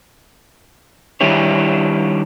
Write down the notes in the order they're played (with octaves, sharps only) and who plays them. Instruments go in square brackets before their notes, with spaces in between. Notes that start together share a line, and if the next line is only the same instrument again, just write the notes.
[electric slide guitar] D#3 G3 D4 E4 G4 C#5